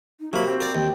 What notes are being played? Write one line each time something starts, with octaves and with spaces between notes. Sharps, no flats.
D#4
C3 F#3 A#3 F#4 B5
C4
A#4 D5
D#2 G5